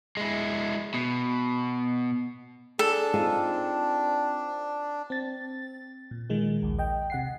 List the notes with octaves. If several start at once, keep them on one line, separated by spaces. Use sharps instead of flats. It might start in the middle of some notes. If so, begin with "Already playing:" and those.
G#3 E4
B2
D4 G#4 A4
C4 D#4 F4 G#4
C4 A6
A#2
A#2 D#3 G#3 A#3
A#1 D#2
D#5 G5
C3 F#5 C7